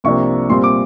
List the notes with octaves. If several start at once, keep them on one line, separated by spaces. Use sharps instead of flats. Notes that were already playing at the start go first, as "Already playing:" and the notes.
C2 C3 F3 A#3 D4 C#6
A#2 G3 C4 C6
D6